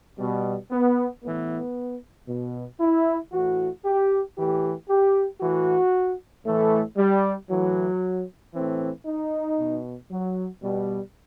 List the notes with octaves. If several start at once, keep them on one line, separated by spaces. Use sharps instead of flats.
B2 G3
B3
A2 E3 B3
B2
E4
A2 E3 F#4
G4
A2 E3 G4
G4
A2 E3 F#4
A2 E3 A3
G3
A2 E3 F#3
A2 E3 C4
D#4
B2
F#3
B2 G3